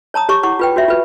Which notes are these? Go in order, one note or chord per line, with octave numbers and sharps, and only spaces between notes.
C#5 A5 A#5 D#6
G4 C#5 C#6 D6
E4 C#5 F#5 C#6 D6
F4 B4 G5
F#4 C#5 E5
F4 B4